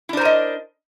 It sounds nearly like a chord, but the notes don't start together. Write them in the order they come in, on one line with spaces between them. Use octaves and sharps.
E4 D4 C5 A#4 D#5